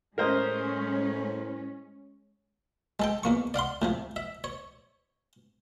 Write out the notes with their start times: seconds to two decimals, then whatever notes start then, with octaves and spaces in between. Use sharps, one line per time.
0.18 A2 G#3 C#4 A#4 C5 D#5
3.00 G#3 A4 G5
3.23 E2 A#3 C#6
3.54 D5 F5 F#5 C6
3.82 A2 C3 F3
4.16 E5
4.44 C#5